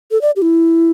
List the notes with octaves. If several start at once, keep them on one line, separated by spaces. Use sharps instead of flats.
A4
D5
G4
E4